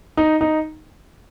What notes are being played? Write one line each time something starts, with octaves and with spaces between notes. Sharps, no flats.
D#4
D#4